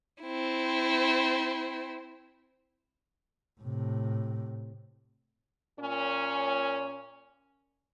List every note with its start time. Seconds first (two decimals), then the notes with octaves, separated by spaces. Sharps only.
0.22 C4 E4
3.61 A2 C3
5.79 A#2 C#4